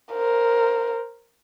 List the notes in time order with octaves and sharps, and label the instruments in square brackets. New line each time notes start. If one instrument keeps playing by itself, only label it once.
[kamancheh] A#4 C5